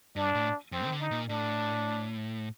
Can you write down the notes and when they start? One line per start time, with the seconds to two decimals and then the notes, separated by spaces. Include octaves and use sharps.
0.16 G2 D4
0.35 A2
0.72 F2 C4
0.86 D#3
0.92 D3
1.01 D#4
1.11 A#2
1.29 A2 D4